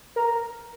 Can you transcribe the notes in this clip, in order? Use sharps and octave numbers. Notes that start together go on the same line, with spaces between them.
A#4